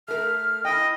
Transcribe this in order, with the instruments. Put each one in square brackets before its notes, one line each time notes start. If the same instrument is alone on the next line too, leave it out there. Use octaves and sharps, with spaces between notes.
[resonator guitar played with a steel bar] A3 A#4 [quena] F6
[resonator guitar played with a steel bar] E4 G5 [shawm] D#5